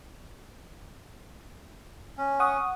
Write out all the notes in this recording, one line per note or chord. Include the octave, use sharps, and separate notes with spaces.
C#4
F#5 C#6 D#6